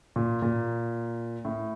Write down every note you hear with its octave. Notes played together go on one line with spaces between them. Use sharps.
A#2
A#2
A2